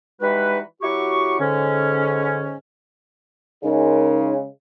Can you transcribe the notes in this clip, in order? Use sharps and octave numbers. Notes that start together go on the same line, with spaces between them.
E3 G3 G#3 D#4 F#4 B4
F#3 E4 F#4 G4 C#6
G#2 D3 C#4
C#3 G#3 D#4 A#4